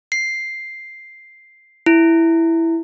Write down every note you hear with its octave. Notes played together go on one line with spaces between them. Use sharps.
C7
E4